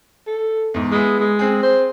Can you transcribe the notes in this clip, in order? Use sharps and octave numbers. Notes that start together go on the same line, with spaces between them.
A4
E2 G#2
G#3 B3 E4 G#4
G#3
C4 G#4
C5